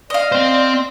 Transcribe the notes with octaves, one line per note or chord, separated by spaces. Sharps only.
D5 D#5 F5
C4 C5